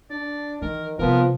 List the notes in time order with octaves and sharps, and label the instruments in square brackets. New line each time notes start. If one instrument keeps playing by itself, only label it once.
[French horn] D4 [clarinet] D5
[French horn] D#3 [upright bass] E3 [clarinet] A#4
[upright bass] C3 G3 [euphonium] F3 [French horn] B3 [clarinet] A#4